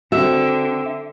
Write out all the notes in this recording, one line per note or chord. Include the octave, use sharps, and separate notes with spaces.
D3 C4 F#4 E5